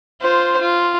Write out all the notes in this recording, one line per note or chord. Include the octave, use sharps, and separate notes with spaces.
F4 C5
F4